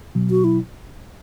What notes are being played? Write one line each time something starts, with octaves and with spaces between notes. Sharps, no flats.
B2 F#3
F#4
E4